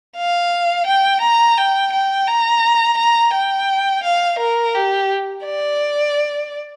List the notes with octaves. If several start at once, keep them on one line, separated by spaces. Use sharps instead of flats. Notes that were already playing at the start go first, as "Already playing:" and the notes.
F5
G5
A#5
G5
G5
A#5
A#5
G5
F5
A#4
G4
D5